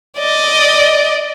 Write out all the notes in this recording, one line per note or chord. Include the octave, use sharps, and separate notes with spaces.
D5 D#5